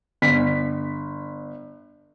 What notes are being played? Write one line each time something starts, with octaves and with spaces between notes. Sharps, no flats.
G1 B6